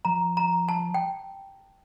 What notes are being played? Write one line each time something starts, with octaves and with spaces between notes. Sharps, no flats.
F3 A#5
A#5
A5
G5